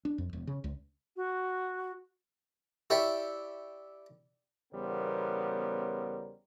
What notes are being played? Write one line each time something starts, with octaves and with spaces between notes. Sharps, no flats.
D4
F2
E1
C#3
C#2
F#4
E4 G4 C#5 D5 E5
E2 C#3 G3 B3 A#4 C5